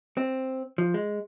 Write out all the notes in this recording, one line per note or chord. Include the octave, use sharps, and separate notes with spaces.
C4
F3
G#3